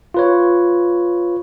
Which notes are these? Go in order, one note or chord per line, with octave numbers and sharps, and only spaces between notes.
F4 B4 C#5